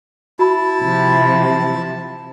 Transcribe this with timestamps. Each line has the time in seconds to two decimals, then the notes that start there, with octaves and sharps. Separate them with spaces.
0.39 E4 F#4 A5 B5
0.82 C3 F3